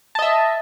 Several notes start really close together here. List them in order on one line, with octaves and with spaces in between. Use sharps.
A5 D#5 E5